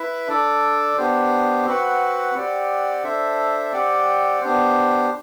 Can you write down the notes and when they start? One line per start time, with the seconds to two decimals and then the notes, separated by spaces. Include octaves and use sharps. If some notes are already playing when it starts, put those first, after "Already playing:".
Already playing: E4 B4 E5
0.28 D4 A4 D5
0.98 B3 D4 G4 C5
1.66 C4 F#4 B4 F#5
2.35 C4 G4 D5 F#5
3.03 D4 A4 C5 E5
3.72 C4 G4 D5 F#5
4.41 B3 D4 G4 C5